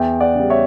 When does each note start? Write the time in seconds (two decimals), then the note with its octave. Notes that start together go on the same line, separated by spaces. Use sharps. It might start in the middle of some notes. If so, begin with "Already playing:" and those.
Already playing: E2 E5 G5
0.20 D5 F#5
0.35 C#3 G3
0.50 C#5 E5